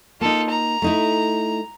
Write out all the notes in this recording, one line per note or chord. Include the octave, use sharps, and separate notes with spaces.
A#3 D#4 F4 A4
A#5
A3 D#4 E4